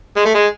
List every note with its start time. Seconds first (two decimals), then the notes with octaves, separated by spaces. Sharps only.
0.16 G#3
0.25 A3
0.35 G#3